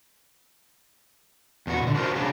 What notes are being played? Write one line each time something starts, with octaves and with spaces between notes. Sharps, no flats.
E2 F#4
B2 D3
D4 F#4 A#4 C5
C#3 F#3 D4